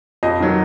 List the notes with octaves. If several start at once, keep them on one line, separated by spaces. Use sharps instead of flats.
F2 D#5
D#3 F#3